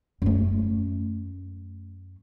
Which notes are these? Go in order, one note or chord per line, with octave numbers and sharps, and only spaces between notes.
F#2 A3